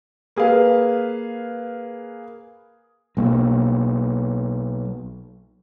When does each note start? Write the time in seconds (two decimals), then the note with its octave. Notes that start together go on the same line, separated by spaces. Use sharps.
0.36 A#3 G#4 B4 F5
3.17 B1 A#3